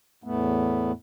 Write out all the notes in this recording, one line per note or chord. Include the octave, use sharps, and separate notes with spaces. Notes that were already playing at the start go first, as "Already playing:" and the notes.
E2 A2 A3 B3